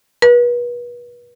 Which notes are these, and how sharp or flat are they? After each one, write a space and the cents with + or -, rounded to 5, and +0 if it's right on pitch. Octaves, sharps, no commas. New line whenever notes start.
B4 -35